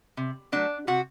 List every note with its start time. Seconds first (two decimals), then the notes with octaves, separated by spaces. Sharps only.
0.17 C3
0.52 F#3 A3 D4
0.87 C3 F#4